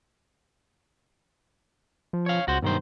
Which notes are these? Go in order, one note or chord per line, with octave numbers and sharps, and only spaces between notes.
F3
C#5 F5
C#2 F#4 C5
B1 G2 D#3 C5